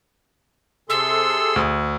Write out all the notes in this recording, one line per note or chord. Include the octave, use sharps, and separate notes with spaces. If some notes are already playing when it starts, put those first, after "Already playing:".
C3 G#4 A4 C6 E6
D2